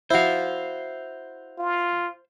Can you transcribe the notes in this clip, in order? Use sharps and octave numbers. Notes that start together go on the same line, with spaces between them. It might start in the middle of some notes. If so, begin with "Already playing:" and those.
E4 F#4 C5 F5
F4